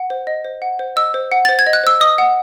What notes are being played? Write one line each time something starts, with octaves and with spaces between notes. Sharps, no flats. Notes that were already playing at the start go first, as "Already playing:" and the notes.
Already playing: F#5
C5
D#5
C5
F#5
C5
D#5 E6
C5
F#5
C5 A6
G#6
D#5
F#6
C5 E6
D#5 D#6
F#5